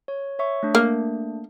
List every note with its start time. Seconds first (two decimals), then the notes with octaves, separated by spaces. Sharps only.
0.08 C#5
0.39 C#5 E5 C#6
0.63 A3 D4
0.75 A#3